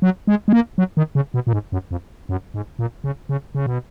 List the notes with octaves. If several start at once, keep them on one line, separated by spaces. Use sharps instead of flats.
F#3
G#3
G#3
A#3
F#3
D#3
C#3
B2
A#2
G#2
F#2
F2
F#2
G#2
A#2
C#3
C#3
C#3
B2